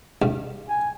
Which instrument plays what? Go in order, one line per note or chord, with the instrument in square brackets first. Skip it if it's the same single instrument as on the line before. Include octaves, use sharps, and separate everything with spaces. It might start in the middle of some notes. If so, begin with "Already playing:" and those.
[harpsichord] A1 G2 C#3
[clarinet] G#5